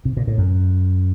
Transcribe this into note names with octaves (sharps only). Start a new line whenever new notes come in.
C3
A#2
A2
F#2